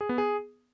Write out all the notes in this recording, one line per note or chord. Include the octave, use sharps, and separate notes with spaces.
G#4
B3
G#4